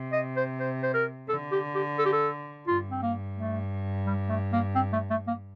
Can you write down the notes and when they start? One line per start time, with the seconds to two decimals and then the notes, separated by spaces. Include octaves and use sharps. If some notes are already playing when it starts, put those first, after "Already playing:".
Already playing: C3
0.13 D#5
0.37 C5
0.60 C5
0.83 C5
0.94 A#4
1.29 D3 A4
1.52 G4
1.75 G4
1.99 A4
2.06 G4
2.13 A4
2.68 G2 F4
2.91 C4
3.02 A#3
3.37 A3
4.06 G3
4.29 A3
4.53 A#3
4.75 C4
4.93 A3
5.11 A3
5.27 A#3